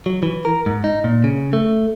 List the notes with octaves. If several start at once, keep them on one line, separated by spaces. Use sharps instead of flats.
F#3
E3
A#4
G#2
D#4
A#2
C#3
A3